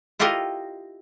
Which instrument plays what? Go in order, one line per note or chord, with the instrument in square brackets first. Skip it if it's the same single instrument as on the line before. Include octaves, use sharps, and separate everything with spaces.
[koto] E4 F4 G4 A4 A#4 D#5